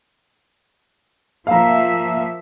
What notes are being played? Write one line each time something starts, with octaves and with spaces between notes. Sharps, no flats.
F3 A#3 E5 F5 A#5